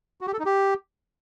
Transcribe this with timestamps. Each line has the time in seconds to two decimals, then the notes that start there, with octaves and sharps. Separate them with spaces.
0.21 F#4
0.27 G4
0.33 A4
0.39 D#4
0.46 G4